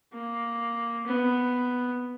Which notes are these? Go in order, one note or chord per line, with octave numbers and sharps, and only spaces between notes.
A#3
B3